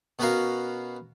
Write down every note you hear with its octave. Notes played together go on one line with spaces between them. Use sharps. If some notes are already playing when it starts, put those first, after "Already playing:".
B2 B3 C#4 F#4 A#4 F5